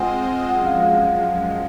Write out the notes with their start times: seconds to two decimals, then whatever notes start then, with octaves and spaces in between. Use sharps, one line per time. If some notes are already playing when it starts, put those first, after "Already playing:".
Already playing: G#3 C4 F4 C5 D#5 F#5 G#5
0.49 F#2 F3 G#3 F#5
0.66 F5
0.82 F5